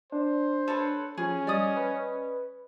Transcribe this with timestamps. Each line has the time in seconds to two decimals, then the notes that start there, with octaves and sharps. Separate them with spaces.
0.12 D4 C5
0.68 A4 B4 C#5
1.18 F3 C#4 G#4
1.47 G3 D5 D#5 D#6
1.76 B4